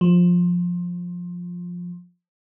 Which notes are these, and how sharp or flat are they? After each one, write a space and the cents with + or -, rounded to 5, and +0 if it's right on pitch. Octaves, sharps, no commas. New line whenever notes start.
F3 +15